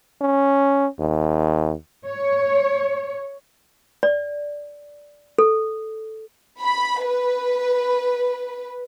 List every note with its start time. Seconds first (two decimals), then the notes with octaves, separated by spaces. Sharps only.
0.21 C#4
0.99 D#2
2.06 C#5
4.03 D5
5.38 A4
6.60 B5
7.05 B4